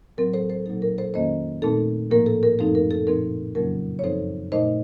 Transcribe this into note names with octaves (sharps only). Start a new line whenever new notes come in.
A2 F#3 C4 A#4
A4 C5
A4 C5
A#2 F#3 A#3 D#4 A4
A#4
A4 C5
F2 D#3 A#3 C#4 C5 D#5
A#2 A3 C4 D#4 A4
A2 F3 A#3 A#4
A4
A#4
F#2 F3 A3 C4 D#4 A4
A#4
A4
A#2 F3 C4 D#4 A#4
F2 C#3 F#3 A#3 C#4 A#4
C#5
F#2 F3 C4 D#4 A4 C5
A#2 A3 D#4 C5 D#5